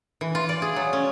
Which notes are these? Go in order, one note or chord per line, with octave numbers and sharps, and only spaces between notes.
E3
F4
D5
G#4
F#3
C#4